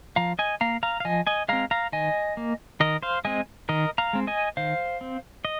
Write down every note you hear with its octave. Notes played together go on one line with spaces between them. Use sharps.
F3 F5 A#5
D#5 G#5
A#3 F5 A#5
F5 A#5
F5
F3 D#5 G#5
D#5 G#5
G#3 C4 F5 A#5
F5 A#5
D#3 D#5 G#5
A#3
D#3 A#4 D#5
C5 F5
G#3 C4 D#5 G#5
D#3 A#4 D#5
F5 A#5
G#3 C4
D#5 G#5
D#3 C5 F5
C4
D#5